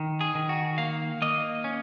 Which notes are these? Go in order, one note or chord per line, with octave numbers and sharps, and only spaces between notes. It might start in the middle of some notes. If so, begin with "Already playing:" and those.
Already playing: D#3
G#4
D#3
F#4
A#3 F5
A#3 D#5
C#4